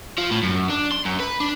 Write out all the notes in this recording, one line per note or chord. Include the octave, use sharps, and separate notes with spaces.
F3
A2
F#2
D4
C6
F#2
B4
D4